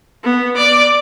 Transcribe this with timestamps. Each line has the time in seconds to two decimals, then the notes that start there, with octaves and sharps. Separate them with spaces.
0.23 B3
0.57 D5